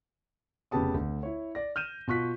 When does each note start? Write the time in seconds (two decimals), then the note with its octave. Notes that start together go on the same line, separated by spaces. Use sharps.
0.71 F1 C#3 B3 G4 A5 D#6
0.94 D2
1.23 E4 C#5
1.55 D5 A#6
1.76 F6 G6 D#7 E7
2.08 B2 F4 C#6 F#6 B6